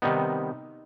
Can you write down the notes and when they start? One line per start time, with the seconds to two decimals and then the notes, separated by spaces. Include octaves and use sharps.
0.02 C3 D#3 G3 B3 D#4